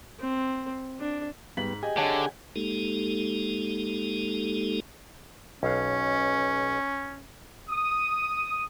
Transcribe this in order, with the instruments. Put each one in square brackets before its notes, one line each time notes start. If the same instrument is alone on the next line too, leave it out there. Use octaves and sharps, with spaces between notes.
[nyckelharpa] C4
D4
[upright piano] G#2 B6 F#7 [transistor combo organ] G3 B3
[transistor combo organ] G4 G#4 G#5 [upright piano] D#5
[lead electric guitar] D3 [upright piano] C#5 D#5 A5
[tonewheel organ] G#3 A#3 D#4 G4 A4
[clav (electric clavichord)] B1 F5 [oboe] C#4
[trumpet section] D#6